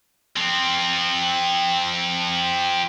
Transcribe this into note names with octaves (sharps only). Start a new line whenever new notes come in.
F3 C4